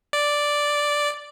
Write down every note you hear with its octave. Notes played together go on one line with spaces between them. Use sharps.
D5